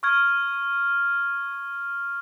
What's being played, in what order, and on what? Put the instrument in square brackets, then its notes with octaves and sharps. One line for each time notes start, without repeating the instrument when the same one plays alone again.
[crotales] C#6 F6 G#6